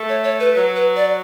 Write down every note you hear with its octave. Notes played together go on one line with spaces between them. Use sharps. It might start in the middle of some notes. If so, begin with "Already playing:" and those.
Already playing: A3
C#5
C#5
B4
F#3 B4
B4
D5